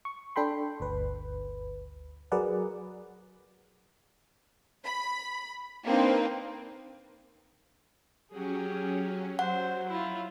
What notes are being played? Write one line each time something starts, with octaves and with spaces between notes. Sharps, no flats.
C#6
D4 A4 G5 B5 C6
G1 D2 B4
F#3 G#4 A#4 B4 D5 F#5
B5
A#3 C4 D4 D#4 B4
F#3 C#4 G4 G#4
F#3 C5 F#5
E4 F4